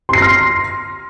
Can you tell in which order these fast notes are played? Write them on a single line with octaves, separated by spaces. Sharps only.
C6 C7 A#6 F6